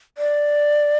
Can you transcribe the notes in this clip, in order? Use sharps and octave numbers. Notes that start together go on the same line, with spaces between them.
D5